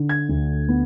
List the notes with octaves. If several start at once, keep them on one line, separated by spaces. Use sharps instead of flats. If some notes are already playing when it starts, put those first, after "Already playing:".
Already playing: D3
G#6
D2
B3